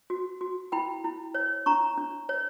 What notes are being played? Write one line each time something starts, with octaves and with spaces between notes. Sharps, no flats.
F#4
F#4
E4 G5 B5
E4
C#5
D4 A#5 C#6
D4
C#5